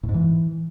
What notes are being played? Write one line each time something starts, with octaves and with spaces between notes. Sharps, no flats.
A2
G#2
E3